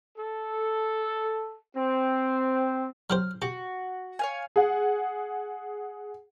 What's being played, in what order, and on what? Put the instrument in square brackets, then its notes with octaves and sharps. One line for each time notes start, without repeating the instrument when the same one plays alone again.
[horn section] A4
C4
[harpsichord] F#3 G4 C5 [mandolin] F6
[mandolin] F#4 [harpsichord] G4
[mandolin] C#5 F5 G#5
[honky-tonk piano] G#4 F#5